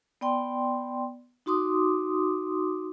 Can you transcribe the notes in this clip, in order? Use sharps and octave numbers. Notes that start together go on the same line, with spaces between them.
B3 D5 G5 C6
D#4 F#4 C6 D6 D#6